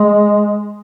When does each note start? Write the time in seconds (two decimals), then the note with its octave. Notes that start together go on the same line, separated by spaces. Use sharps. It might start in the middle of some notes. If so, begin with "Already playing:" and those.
Already playing: G#3